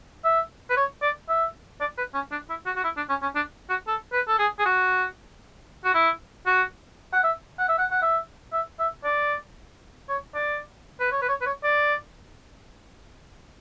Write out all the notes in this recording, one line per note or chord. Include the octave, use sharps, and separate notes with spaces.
E5
B4
C#5
D5
E5
D5
B4
C#4
D4
E4
F#4
F#4
E4
D4
C#4
C#4
D4
F#4
A4
B4
A4
G#4
G#4
F#4
F#4
E4
F#4
F#5
E5
F#5
E5
F#5
F#5
E5
E5
E5
D5
C#5
D5
B4
C#5
B4
C#5
B4
C#5
D5